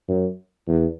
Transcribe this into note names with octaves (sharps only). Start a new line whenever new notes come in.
F#2
E2